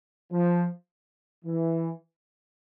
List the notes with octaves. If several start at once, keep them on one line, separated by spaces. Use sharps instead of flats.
F3
E3